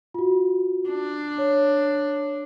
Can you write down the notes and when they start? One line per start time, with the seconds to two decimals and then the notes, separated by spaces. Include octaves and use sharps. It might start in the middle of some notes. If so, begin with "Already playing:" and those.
0.14 F4 F#4
0.89 D4
1.38 C#5